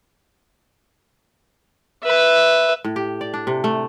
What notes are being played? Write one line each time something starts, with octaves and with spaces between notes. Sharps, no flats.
B4 E5
A2
G4
D5
D4
C3
A3